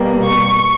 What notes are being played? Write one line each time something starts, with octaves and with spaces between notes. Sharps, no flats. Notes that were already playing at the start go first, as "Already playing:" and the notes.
Already playing: B2 G3 A#3
C#6